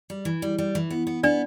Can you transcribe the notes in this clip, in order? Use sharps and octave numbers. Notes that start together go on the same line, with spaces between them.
G3
E3
G3
G3
E3
B3
B3
B3 D4 D5